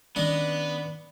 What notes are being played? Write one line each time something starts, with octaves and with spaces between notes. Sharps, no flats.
D#3 B3 C#4 D4 D#5